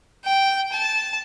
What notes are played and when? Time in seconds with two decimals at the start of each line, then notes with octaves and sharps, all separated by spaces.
0.25 G5
0.72 A5